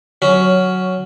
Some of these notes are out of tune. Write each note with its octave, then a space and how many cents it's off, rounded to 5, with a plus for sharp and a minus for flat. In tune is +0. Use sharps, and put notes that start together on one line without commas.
F#3 +0 C#4 +10